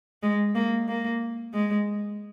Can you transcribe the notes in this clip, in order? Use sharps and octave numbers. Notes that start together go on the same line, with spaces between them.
G#3
A#3
A#3
G#3